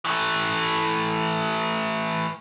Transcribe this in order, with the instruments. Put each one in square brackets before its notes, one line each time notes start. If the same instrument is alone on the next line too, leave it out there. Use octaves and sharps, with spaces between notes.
[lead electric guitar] E3 A3